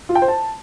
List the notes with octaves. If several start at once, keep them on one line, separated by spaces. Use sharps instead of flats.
F4
G5
C5
A5